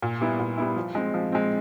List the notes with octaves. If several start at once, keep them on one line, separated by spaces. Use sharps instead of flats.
A#2
G3 B3 E4
A#2
G3 B3 E4
F3
G#3 C4
F3
G#3 C4